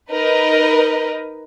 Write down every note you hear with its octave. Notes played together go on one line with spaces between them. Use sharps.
D#4 A#4 B4 D#5